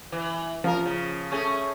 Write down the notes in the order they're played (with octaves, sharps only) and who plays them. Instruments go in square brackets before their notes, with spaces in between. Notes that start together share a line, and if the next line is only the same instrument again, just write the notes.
[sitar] E3
[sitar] F#2 A#4 [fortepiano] F3 F4
[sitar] C#3
A3 C#4 G#4